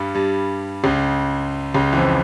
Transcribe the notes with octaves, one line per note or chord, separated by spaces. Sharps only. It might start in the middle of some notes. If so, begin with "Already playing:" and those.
Already playing: G2 G3
G2 G3
C#2 C#3
C#2 C#3
E3
F2 F3